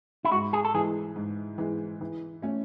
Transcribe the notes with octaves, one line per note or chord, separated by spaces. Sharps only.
E4
G#2 F#4
G#4
A4
E3 G#3 G#4
G#2
E3 G#3
E3
A3 C#4